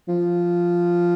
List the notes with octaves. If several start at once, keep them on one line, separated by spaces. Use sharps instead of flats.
F3